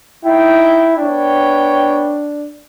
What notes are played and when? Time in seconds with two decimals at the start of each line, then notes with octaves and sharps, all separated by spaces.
0.24 D#4 E4 G5
0.97 B3 D4 C#5 G5